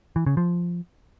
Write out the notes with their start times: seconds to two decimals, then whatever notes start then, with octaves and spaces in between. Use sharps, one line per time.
0.16 E3
0.26 C#3
0.37 F3